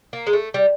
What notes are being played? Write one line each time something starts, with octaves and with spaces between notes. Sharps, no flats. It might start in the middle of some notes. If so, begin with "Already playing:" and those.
A#3
G#3
A3
G3